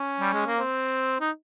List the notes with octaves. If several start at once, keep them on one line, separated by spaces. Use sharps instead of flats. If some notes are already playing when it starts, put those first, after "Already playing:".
Already playing: C#4
G3
G#3
A#3
C4
D#4